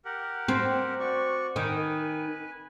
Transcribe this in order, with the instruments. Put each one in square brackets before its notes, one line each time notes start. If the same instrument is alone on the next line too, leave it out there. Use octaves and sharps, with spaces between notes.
[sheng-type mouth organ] G4 A#4 F#5
[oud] C4
[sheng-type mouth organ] F#4 D5 C#6
[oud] D#3 [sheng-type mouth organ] B4 G#5